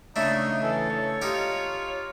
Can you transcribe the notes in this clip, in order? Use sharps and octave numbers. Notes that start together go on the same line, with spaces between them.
C#3 A3 D4 D#4 E5
E3 A4
C#5
D#4 F4 G4